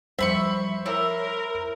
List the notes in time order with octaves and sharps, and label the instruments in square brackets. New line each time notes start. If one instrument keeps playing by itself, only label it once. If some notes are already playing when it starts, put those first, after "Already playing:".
[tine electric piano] F3 G3 [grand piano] C5 [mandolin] E5 B5 C#6
[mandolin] E4 [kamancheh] A#4 [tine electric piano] C#5